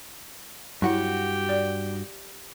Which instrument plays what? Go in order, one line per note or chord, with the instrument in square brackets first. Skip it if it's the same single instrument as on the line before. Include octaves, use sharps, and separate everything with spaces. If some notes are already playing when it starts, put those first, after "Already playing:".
[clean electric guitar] G2 F#4 F#5 [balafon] F#3 E4 [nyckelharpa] G4 G5
[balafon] D5